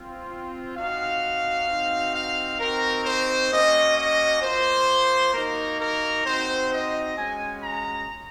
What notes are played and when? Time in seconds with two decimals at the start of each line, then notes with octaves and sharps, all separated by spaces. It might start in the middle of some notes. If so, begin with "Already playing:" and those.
Already playing: C4 F4
0.76 C4 D#4 F#4 F5
1.68 C4 D#4 F#4
2.13 F5
2.59 C4 D#4 F#4 A#4
3.05 C5
3.51 A#3 C#4 F#4 D#5
3.97 D#5
4.42 A#3 F4 C5
5.33 A#3 D#4 F#4 A#4
5.80 A#4
6.24 C4 D#4 F#4 C5
6.71 D#5
7.16 G#3 C#4 F#4 G#5
7.62 A#5